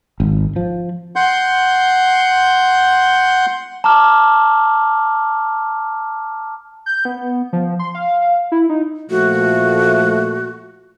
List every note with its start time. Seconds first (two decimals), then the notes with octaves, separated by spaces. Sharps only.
0.20 G#1
0.56 F3
1.16 F#5 C6 G6
3.84 A5 A#5 D6 F6
6.86 G6
7.05 B3
7.53 F3
7.79 C6
7.95 F5
8.52 E4
8.69 D#4
9.10 A#2 F3 A3 F#4